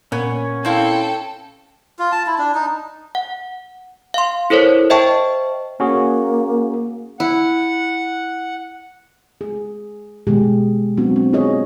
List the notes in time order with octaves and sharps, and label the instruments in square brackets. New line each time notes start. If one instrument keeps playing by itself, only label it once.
[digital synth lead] A#2 [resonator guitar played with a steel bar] B3 [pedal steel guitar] C#4 C#5
[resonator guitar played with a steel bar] C4 E4 F5 [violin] A4 G5
[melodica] F4
A5
E4
D4
D#4
[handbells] F#5
F5 C6
E4 A4 A#4 C5 C#5
C5 D#5 E5 G5 A5 C#6
[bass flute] A#3 [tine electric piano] C#4 F#4 G#4
[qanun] E4 [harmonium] F#5
[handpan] G#4
B2 D#3 G#3 G4 G#4
F#3 B3 C4 D4 F#4
C4
D#4 F4 G#4 C#5 D#5